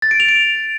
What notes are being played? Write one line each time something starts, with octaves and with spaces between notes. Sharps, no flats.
A6
D7
F7
D7